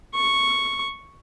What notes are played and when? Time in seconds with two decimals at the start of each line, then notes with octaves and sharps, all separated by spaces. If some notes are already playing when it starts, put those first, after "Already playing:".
0.14 C#6